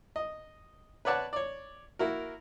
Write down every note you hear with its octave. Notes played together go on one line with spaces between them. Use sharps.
D#5
B4 C#5 D5 F#5 A5
C#5 D5
A#3 E4 F#4 A#4